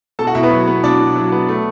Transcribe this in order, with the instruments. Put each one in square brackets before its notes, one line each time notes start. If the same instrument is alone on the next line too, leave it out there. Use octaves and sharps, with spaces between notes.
[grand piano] B2 A4 A5
F#4 F#5
B2 E4 E5
B3 B4
F#3
B3
B2 D4 D5
B2
F#3
B3
A3